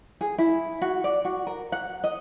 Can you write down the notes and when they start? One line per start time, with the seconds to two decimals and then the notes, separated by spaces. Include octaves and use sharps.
0.21 G#4
0.38 E4
0.82 F#4
1.04 D5
1.25 F#4
1.47 A#4
1.72 F#5
2.04 D#5